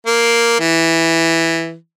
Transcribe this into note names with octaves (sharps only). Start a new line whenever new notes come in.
A#3
E3